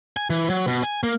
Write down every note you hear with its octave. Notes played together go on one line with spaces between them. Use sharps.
G#5
E3
F#3
B2
G#5
A#3